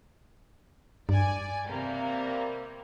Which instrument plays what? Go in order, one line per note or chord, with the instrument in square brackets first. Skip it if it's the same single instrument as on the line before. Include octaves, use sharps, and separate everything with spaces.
[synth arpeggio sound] G2 [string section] D5 G#5
[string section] C3 G3 A#3